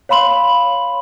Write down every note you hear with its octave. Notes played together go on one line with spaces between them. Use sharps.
C#5 F5 B5 C6 F#7